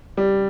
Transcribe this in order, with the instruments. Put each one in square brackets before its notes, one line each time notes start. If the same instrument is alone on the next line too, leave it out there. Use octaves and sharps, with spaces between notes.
[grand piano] G3